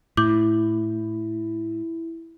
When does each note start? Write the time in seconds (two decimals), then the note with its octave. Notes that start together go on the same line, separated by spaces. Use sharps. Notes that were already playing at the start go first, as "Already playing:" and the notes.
0.17 A2 E4 D6 G6 F#7